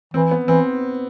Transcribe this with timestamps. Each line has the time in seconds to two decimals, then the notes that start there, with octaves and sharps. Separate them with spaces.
0.14 E3 C4
0.31 B3
0.48 E3 C4